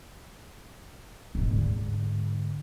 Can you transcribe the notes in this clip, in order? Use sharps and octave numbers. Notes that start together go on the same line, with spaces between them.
G#1 A#2
G#2 D3